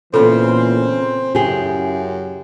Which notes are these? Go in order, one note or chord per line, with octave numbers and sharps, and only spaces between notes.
A#2 C#3 E3 B3 C4 A4
F#2 C#3 E4 G4 G#4